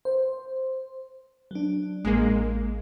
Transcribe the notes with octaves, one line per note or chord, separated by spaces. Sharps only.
C5
F#3 D4
A1 G#3 A#3